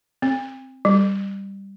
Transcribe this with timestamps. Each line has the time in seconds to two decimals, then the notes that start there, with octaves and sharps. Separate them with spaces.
0.22 C4
0.85 G3